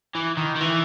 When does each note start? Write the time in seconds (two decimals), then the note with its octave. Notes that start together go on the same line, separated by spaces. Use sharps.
0.15 E3
0.37 D#3
0.56 D#3
0.61 E3